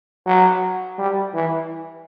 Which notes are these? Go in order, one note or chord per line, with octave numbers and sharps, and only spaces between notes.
F#3
G3
E3